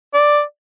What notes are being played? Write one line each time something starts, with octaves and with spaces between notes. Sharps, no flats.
D5